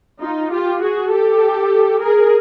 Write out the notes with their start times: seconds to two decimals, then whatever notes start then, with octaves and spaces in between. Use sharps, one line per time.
0.21 D#4 F4
0.51 F4 G4
0.81 F#4 G#4
1.11 G4 A4
2.01 G#4 A#4